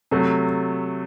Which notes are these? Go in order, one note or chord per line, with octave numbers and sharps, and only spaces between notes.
C3 F#3 A3